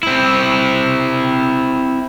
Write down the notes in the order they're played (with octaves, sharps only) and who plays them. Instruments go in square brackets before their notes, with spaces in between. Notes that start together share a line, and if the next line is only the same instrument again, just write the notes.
[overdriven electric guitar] C4 E4